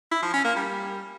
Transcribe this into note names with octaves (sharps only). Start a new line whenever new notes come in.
E4
F3
C#4
A#3
G3